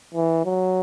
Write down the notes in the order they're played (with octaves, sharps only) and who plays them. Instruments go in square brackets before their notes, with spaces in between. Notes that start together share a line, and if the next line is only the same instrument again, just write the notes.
[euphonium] E3
F#3